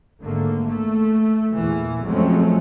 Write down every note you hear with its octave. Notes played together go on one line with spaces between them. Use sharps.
G#1 D3 A3 A#3
A3
E2 A#2 E3
F2 F#3 G#3 A3 C4 C#4